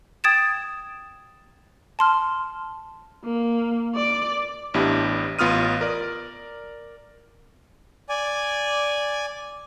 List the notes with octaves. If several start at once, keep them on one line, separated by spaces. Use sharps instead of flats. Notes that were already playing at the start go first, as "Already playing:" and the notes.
G5 D#6 G#6 A6 D7 E7
A5 C6 F6
A#3
D5 D6
A1 B3 D4 E4 G4
A1 B3 F4 D#6 F6 D#7
A#4 D5
D5 G#5